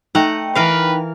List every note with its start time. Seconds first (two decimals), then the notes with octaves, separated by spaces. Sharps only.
0.15 A3 D#4 F#5 G5 A#5
0.55 E3 A#4 B4 F5